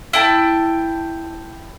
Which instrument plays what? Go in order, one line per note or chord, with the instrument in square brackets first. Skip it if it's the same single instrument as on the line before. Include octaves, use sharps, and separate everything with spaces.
[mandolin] E4 G5 A5